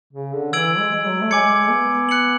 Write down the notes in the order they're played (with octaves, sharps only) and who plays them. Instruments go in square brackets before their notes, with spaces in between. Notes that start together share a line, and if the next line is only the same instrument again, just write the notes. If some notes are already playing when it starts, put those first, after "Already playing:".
[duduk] C#3
D3
[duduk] E3 [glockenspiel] E6 G#6 D7 F#7
[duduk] G#3
G#3
F#3
A3
[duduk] G#3 [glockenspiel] G#5 D6 G#6 C#7
[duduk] B3
[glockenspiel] F#6 C#7 F#7